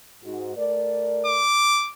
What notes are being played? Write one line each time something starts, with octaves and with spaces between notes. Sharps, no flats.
G#2 F#4
A3 A#4 D5
D6